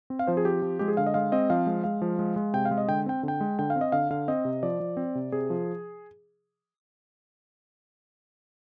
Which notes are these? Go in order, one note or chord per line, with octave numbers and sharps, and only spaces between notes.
C4
F5
F3 C5
G#4
C4 G4
F3
G#3 G4
G#4
D3 F5
D#5
G#3 F5
C4 D#5
F3 F5
G#3
G#3 F5
F3
G#3
G#3
C3 G5
F5
G#3
D#5
D3 G5
C4 G5
D3
G5
G#3
D3 G5
F5
C4
D#5
D3 F5
D3 F5
C4 D#5
C3
F3 D5
F3
C4
C3
C3 G#4
F3